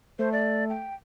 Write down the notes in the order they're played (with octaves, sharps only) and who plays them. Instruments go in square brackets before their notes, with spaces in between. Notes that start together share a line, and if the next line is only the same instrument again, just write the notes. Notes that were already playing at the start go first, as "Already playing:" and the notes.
[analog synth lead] A3 [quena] C5
[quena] D5
G5